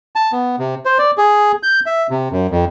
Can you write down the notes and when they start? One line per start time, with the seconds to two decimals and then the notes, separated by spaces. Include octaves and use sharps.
0.16 A5
0.32 B3
0.59 C3
0.85 C5
0.98 D5
1.18 G#4
1.63 G6
1.86 E5
2.10 C3
2.32 F#2
2.51 F2